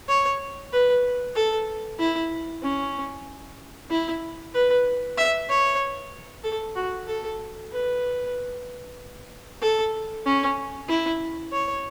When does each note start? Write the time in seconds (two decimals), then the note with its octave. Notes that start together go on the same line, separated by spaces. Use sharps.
0.08 C#5
0.72 B4
1.36 A4
1.99 E4
2.63 C#4
3.91 E4
4.54 B4
5.18 E5
5.49 C#5
6.44 A4
6.76 F#4
7.07 A4
7.72 B4
9.62 A4
10.26 C#4
10.89 E4
11.52 C#5